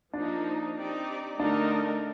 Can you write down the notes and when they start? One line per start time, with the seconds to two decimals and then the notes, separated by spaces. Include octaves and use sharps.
0.13 F3 A#3 D4 D#4
0.77 C4 D#4 G4 D5
1.39 D3 A3 D4 D#4 A#4